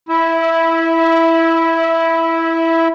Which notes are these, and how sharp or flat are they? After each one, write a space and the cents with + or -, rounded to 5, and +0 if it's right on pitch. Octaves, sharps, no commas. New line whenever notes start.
E4 +0 E5 -25